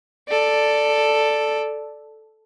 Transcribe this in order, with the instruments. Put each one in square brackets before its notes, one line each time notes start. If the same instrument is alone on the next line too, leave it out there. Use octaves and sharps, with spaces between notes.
[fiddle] A4 D5